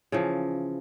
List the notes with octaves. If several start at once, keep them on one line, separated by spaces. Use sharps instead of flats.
C#3 E3 F3